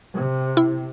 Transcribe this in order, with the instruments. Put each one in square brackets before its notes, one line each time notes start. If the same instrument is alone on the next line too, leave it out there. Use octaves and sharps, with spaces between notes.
[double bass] C3
[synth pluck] E4